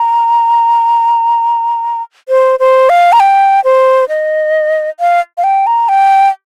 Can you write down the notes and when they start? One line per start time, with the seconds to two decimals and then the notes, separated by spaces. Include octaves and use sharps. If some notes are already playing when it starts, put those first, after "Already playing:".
Already playing: A#5
2.29 C5
2.60 C5
2.89 F5
3.13 A#5
3.20 G5
3.64 C5
4.09 D#5
5.00 F5
5.38 F5
5.44 G5
5.67 A#5
5.89 G5